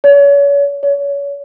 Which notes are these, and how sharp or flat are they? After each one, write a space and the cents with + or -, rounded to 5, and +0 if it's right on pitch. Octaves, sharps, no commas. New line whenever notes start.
C#5 +35
C#5 +30